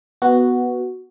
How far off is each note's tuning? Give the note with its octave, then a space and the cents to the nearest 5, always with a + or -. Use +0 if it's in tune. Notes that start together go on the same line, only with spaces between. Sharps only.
B3 +0 F#4 +0